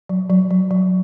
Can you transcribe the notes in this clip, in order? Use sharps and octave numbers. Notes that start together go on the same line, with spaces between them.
F#3
F#3
F#3
F#3